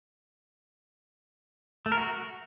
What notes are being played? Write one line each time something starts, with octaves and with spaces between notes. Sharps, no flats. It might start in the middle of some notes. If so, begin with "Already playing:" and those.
A3
A#4
F#4